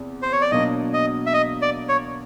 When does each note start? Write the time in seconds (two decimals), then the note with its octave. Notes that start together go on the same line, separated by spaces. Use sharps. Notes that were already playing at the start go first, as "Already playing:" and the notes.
Already playing: E2 C3
0.22 C5
0.32 C#5
0.41 D5
0.51 B2 F#3 A#3 D4 D#5
0.93 D#5
1.26 E5
1.34 D#5
1.62 D5
1.89 C#5